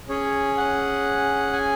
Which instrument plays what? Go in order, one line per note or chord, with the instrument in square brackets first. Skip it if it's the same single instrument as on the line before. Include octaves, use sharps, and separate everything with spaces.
[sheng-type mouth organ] C#4 G#4 C#5
F#5
G#5